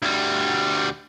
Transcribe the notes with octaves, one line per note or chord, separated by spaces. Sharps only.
D2 G3